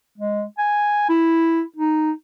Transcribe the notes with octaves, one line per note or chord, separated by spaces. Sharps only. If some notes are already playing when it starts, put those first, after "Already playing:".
G#3
G#5
E4
D#4